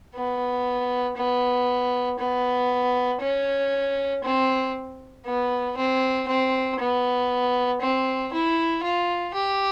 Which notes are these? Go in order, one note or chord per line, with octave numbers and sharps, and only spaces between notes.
B3
B3
B3
C#4
C4
B3
C4
C4
B3
C4
E4
F4
G4